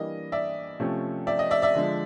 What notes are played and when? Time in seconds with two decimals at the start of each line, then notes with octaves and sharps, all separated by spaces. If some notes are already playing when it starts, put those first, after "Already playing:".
Already playing: E3 G3 A#3 D4 D#5
0.32 D5 E5
0.80 C3 F3 A3 C#4
1.27 D5 E5
1.39 D#5
1.51 D5 E5
1.62 D5 E5
1.75 D3 F3 G#3